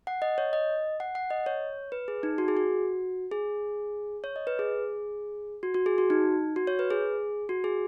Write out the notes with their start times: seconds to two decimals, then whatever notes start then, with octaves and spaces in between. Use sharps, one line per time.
0.07 F#5
0.22 D#5
0.38 C#5
0.53 D#5
1.00 F#5
1.15 F#5
1.30 D#5
1.46 C#5
1.92 B4
2.08 G#4
2.23 D#4
2.38 F#4
2.48 G#4
2.57 F#4
3.32 G#4
4.24 C#5
4.36 D#5
4.47 B4
4.59 G#4
5.63 F#4
5.74 F#4
5.86 G#4
5.98 F#4
6.10 D#4
6.56 F#4
6.67 C#5
6.79 B4
6.91 G#4
7.49 F#4
7.64 G#4